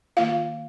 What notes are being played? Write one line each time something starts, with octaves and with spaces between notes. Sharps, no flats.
D#3 A#3 F4 F5